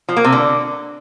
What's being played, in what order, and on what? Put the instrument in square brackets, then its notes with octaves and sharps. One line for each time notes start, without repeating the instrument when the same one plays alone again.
[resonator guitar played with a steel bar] F3
A#3
C3
D3